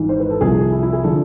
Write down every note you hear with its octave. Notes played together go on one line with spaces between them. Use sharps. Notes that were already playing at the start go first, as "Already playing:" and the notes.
Already playing: G#1 G#2 E3
C5
B4
A4
C2 C3 F3 G#4
E4
E4
G#4
D3 F3 A4